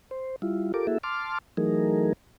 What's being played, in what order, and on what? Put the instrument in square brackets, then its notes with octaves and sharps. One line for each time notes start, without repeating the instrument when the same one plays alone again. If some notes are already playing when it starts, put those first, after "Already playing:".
[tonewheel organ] C5
G3 E4 F4
F4 G4 A4 A#4 D6
A#3 E4 F#4 G#4 A4 E5
A5 C6 D6 F6
E3 F#3 A3 D#4 G#4 A#4